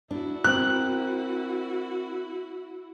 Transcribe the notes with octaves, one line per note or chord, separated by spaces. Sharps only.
D4 E4 F#4
C4 A#4 F#6